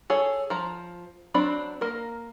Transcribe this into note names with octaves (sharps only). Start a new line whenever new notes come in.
G#4 A4 C#5
F3 A#5
F#3 C4 D4 B5
A#3 A#4